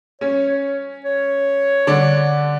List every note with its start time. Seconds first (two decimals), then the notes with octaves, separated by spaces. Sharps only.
0.21 C#4 C#5
0.48 C#5
1.05 C#5
1.87 D3 D4